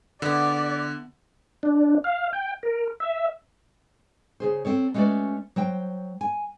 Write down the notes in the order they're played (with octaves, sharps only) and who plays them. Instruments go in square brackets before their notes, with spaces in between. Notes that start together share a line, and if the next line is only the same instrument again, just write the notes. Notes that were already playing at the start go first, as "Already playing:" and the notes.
[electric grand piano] D3 [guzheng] B3 E4 [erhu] D5
[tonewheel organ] D4
F5
G5
A#4
E5
[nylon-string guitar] C#3 G#4 C5
C4 A4 C#5
G#3 A3 C#4 F#4 B4 D5
F#3 C5 G5
G#5